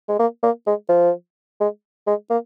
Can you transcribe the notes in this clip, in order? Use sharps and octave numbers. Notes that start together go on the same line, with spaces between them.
G#3
A#3
A#3
G#3
F3
G#3
G#3
A#3